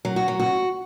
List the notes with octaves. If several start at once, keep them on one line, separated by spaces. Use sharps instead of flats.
F#3
F#4
F#3
F#4